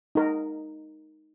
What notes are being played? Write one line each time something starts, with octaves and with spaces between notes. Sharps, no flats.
D#4 A#4